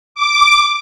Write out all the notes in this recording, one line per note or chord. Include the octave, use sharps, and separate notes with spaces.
D6